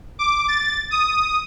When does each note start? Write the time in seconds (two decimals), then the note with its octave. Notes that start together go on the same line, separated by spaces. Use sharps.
0.19 D6
0.48 A6
0.91 D#6